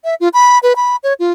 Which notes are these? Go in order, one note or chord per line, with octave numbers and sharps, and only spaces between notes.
E5
F4
B5
B4
B5
C#5
F4